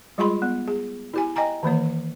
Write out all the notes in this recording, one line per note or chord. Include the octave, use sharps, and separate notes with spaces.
G3 G#3 F4 G#4 B5 C6
B3
G#4
E4 G4 G#5
D#5 G5 G#5 A#5
D#3 E3 A#3 C#5